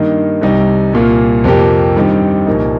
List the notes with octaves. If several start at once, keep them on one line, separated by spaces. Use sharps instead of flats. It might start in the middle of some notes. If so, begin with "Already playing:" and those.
Already playing: G2 D#3 A#3 D#4
C2 C3 G3 D#4
C2 A#2 A#3 F4
F2 C3 F3 A#3 G4
G2 D#3 G3 C4 G4
C2 A#2 F3 A#3 D#4